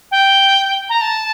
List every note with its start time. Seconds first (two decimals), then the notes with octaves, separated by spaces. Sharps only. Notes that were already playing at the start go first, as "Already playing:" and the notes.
0.11 G5
0.89 A#5
1.01 A5